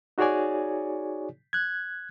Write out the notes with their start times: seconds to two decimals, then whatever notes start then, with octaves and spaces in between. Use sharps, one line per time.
0.18 D#4 F#4 G#4 C#5 D5 G#5
1.53 F#6 G#6